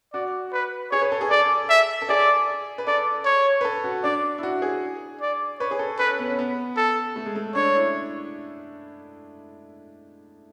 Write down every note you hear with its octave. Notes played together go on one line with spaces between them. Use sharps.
F#4 D5
B4
G#4 C#5
B4
A4
G#4
A4 D5
E5
A4
G#4 D5
B4
A4 D5
C#5
B4
A4
F#4
D4 D5
E4
F#4
G#4
D5
B4 C#5
G#4
A4
A4 B4
C#4
B3
C#4
B3
A4
A3
G#3
A3
D4 C#5
E4